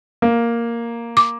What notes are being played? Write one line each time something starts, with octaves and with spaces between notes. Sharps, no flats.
A#3
D6